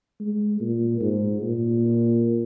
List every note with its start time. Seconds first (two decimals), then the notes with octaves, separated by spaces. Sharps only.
0.20 G#3
0.60 A#2
1.01 G#2
1.42 A#2